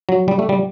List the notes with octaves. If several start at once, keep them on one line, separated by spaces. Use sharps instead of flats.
F#3
G3
A3
G3